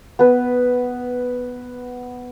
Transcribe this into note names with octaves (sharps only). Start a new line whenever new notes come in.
B3 B4